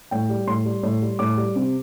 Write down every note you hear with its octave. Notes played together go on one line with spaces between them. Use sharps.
A2 G5
G3
A2 C6
G3
A2
G3
A2 D6
G3
C3